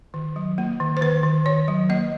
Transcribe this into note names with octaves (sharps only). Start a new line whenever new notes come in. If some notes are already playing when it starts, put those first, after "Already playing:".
D#3
F#3
A#3
D#3
C5
D#3 B4
D#3
D#3 C#5
F#3
A#3 D#5